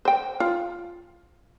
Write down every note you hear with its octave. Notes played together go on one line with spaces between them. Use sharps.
C5 G5
F4